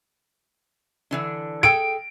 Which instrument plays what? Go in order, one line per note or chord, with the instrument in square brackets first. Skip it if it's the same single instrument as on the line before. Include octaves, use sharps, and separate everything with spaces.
[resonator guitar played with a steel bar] D3 E3 D4
[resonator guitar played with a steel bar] G#4 A4 G5 [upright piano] D7